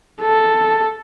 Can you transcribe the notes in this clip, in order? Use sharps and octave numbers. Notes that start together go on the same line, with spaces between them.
A4